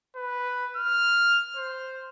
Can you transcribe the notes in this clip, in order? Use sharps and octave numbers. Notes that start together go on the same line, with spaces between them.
B4
F6
C5